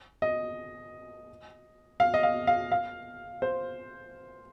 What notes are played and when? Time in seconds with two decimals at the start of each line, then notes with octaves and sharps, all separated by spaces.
0.22 D#5
2.00 F5
2.14 D#5
2.23 F5
2.47 F5
2.72 F5
3.42 C5